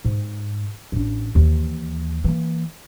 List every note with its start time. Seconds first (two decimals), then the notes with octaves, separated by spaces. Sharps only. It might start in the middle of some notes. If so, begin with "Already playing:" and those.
0.05 G#2
0.92 A1 D4
1.35 D#2 E3
2.24 E3 A#3